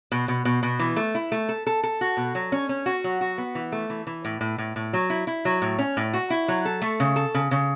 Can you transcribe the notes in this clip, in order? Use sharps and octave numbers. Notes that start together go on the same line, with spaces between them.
B2
B2
B2
B2
E3
A3
E4
A3
A4
A4
A4
F#4
B2
F#3
C#4
C#4
F#4
F#3
F#4
B3
E3
A3
E3
E3
A2
A2
A2
A2
F#3
E4
E4
F#3
A2
C#4
A2
F#4
E4
F#3
A4
A3
C#3
A4
C#3
C#3